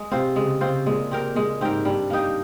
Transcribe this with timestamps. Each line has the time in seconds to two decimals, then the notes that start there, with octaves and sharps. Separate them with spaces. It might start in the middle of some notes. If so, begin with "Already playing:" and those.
Already playing: G#3
0.11 C3 C4 F4 C5
0.35 C#3 G#3
0.61 C#3 C4 F4 C5
0.86 A#2 G#3
1.11 C4 G4 A#4
1.35 A#2 G#3
1.60 G#2 C4 G4 A#4
1.85 G2 G3
2.10 A#3 D#4 G4